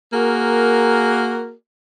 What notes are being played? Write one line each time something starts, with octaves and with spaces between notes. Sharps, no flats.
A#3 F#4 G#4 A#4